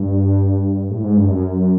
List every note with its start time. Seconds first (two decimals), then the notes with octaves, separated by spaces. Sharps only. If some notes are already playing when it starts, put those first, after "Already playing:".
Already playing: G2
0.91 A2
1.03 G#2
1.17 G2
1.29 F#2